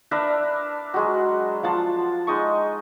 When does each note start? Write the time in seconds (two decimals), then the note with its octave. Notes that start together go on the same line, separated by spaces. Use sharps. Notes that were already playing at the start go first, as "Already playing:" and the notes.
0.11 D4 A#4 B4 E5
0.94 F#3 G#3 F#4
1.63 F3 F#5 A5 C6
2.27 G#3 D#4 D#5 C#6